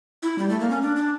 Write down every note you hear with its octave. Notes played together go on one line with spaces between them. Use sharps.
E4
G3
A3
A#3
C#4
D4
D4